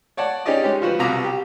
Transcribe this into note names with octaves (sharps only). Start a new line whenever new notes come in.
C#5 D5 F#5 A5
C#4 D#4 G4 G#4 D5 D#5
G#3 C#4 G4
F3 F#4 B4
C2 B2 F4 F#4 A#5 D6
G4